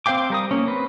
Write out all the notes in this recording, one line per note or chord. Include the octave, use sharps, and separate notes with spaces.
C4 C5 F5 G5 D6
G3 A#4 D#6
A#3 C#4
C4 B4